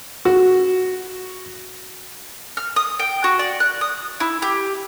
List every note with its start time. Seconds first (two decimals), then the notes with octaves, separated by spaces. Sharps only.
0.25 F#4
2.57 F6
2.76 D#6
2.99 G5
3.24 F#4
3.39 D5
3.60 F#6
3.81 D#6
4.20 E4
4.42 G4